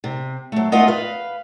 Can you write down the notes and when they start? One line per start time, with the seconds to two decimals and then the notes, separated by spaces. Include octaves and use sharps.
0.04 C3
0.52 F#3 A3
0.72 A3 F4 B4 D#5 F#5
0.88 B4 F5